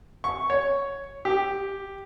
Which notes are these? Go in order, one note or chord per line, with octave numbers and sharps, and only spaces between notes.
C#6
C#5
G4